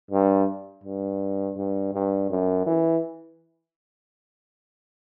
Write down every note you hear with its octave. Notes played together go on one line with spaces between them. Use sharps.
G2
G2
G2
G2
F#2
E3